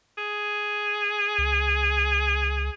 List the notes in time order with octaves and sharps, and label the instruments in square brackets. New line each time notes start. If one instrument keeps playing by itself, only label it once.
[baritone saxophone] G#4
[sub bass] C#2